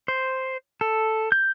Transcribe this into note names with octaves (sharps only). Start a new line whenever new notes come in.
C5
A4
G6